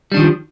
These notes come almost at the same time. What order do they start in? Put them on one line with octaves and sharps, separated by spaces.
G3 D4 D#3 F3